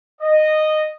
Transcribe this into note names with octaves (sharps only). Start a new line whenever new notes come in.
D#5